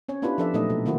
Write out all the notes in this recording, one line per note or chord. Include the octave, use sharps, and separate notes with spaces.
C4 C#4 C#5
B3 D4 E4 F4 G4 B4
F3 D4 A4 D5 E5
A#2 F#3 A3 C4 D#4 D#5
B2 A4
D#3 A#3 C4 E4 F#4 C5